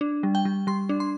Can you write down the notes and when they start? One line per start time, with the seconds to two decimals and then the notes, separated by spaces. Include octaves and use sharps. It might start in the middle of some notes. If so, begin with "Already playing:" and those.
0.01 D4
0.23 G3
0.35 G5
0.45 G3
0.67 G3 C6
0.89 D4
1.00 C6